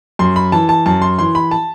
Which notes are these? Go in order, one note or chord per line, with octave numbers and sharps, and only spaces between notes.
F#2 C6
B5
E3 A5
A5
F#2 A5
C6
E3 C6
B5
A5